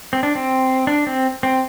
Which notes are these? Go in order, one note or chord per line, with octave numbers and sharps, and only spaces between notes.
C4
D4
C4
D4
C4
C4